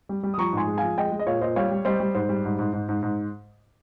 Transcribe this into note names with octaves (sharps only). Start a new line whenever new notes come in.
G3
G3
D#6
F3 A#5 C#6
G#2 G#5 C6
G#3
F3 F5 G#5
G#3 D#5 G5
G#3
D#5
A#2 C#5 F5
A#2 C5 D#5
G3 C#5 F5
G3
G3 C5 D#5
G3
G#2 C5
G3
G#2
G#2
G#2
G#2
G#2